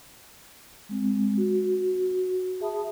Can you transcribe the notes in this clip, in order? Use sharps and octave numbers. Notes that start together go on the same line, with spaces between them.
G#3 C4
F#4
G#4 E5 A5 B5 D#6